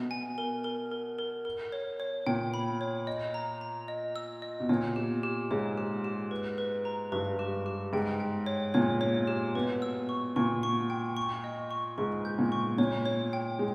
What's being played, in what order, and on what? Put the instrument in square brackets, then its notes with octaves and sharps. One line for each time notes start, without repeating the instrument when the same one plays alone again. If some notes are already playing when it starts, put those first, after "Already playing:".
Already playing: [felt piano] B2
[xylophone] G#5
A#4
A#4
A#4
A#4
A#4
C#5
C#5
[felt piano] A#2 [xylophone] G5
[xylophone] B5
C#5
D#5
A#5
A#5
D#5
E6
D#5
[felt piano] B2
[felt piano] A#2 [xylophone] C#5
[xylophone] G4
G4
[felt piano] G#2 [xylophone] C#5
[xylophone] G4
G4
B4
B4
A#5
[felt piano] G2 [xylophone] B4
[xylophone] G4
G4
[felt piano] G#2 [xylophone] G5
[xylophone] G5
C#5
[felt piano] A#2 [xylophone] C#5
[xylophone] C#5
G4
[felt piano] B2 [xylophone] B4
[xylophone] E6
C#6
[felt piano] A#2 [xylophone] C#6
[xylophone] C#6
G5
C#6
D#5
C#6
[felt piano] G#2 [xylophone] C#6
[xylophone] G6
[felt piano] A#2
[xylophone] C#6
[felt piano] A#2 [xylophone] C#5
[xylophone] C#5
G5
[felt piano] G#3